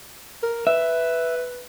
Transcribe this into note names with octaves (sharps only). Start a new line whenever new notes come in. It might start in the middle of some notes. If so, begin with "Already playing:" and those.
A#4
B4 E5